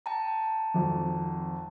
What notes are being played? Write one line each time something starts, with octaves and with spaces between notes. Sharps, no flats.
G5 A5 A#5
G#1 F2